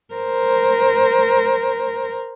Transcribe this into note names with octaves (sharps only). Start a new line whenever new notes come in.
A#4 C5